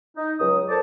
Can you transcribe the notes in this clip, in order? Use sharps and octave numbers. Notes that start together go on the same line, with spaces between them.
D#4
C#2 F#3 D#6
A4 A#4 C5 D5 A5